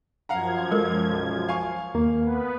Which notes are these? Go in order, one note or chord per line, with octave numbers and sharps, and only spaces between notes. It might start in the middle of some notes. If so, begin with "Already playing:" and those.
F#2 F3 F5 F#5 A#5 G#6
G#3 A4 A#4
B1
F5 G#5 C#6
D#2 A#3
B3 B4